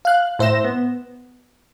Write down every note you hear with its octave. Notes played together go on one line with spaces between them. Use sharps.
F5 F#6
A2 C5 E5 A#6 E7
B3